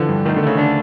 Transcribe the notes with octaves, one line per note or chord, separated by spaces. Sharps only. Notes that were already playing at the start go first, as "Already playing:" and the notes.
Already playing: D3 E3 F3
G2
D#3 A3
D3
C#3 A3
D3 D4